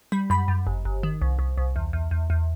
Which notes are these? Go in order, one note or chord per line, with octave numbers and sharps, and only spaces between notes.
G3 B5
F#2 B5
F#2
G1
G1
D#3
C2
C2
C2
E2
E2
E2
E2